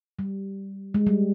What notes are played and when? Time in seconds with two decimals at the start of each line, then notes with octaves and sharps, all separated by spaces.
0.19 G3
0.94 G#3
1.07 G3